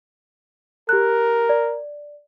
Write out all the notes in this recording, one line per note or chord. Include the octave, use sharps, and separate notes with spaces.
G4 A#4 F#6
D5